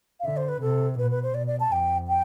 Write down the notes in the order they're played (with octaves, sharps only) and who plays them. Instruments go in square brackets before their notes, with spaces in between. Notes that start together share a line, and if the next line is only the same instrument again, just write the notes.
[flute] F5
[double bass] D3 [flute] E5
[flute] C5
B4
[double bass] C3 [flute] A4
[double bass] B2 [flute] B4
[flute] B4
C5
[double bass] B2 [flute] D5
[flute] D5
A5
[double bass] F2 [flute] G5
[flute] G5